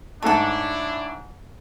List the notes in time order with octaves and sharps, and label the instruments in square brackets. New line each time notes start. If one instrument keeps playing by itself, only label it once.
[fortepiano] G#2 A3 A5 [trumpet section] D4 E4 [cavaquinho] A4 C#5